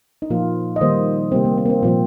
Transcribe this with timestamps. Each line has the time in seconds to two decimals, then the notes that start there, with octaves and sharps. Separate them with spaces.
0.22 D#4
0.30 A#2 F3 A#3 F4
0.76 D#5
0.81 D#3 G3 A#3 C5
1.32 C3 G3 A#3 C4
1.45 A#3
1.58 C4
1.66 A#3
1.70 C4
1.83 A#2 F3 A#3 C4